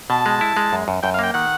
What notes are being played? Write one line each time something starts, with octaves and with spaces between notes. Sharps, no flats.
B2 A5
G#3
E4
G#3
F#2
F#2
F#2 G5
F5
A#3 G5
D#3 F#5